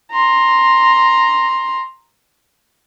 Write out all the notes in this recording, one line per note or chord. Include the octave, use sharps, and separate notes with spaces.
A#5 C6